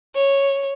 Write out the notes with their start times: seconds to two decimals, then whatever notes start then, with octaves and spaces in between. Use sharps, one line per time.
0.15 C#5